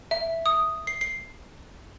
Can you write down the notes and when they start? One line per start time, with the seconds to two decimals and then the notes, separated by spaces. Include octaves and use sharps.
0.11 E5
0.46 D#6
0.87 C7
1.01 C7